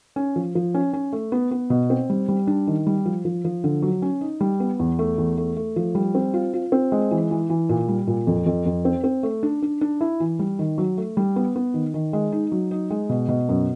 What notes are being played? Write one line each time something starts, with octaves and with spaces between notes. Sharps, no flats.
C#4
F3
F3
C#4
C#4
A3
B3
B3
B2
C4
G3
G3
D4
D#3
G3
F3
F3
F3
D3
F#3
C#4
D#4
G3
B3
E2
A3
E2
A3
A3
F3
G3
C4
F4
F4
C4
G#3
E3
E3
E3
A#2
G3
A#2
F2
F2
F2
C4
C4
A3
D4
D4
D4
E4
E3
G3
D#3
F#3
A3
G3
B3
B3
D#3
D#3
G#3
D#4
F#3
D#4
G#3
B2
B2
F#2